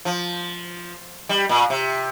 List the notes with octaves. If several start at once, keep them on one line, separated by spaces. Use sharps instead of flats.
F3
G3
A#2
C3